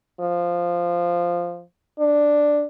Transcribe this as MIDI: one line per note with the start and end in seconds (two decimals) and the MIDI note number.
0.20 1.63 53
1.99 2.65 62